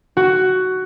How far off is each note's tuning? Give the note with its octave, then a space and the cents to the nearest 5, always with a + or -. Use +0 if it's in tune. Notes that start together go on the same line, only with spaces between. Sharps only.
F#4 +10